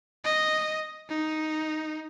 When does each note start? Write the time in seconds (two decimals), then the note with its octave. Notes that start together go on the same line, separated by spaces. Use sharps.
0.25 D#5
1.09 D#4